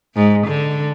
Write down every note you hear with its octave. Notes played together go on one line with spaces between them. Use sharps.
G#2
D3